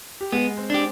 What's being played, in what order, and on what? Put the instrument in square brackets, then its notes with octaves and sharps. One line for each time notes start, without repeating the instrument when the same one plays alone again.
[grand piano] G4
[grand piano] G#3 G#4 [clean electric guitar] B3
[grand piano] C4 C5
[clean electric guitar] D4 G4